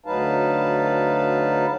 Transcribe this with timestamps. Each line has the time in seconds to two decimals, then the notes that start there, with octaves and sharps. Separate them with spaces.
0.06 D2 F#3 D#4 B4 F5 A5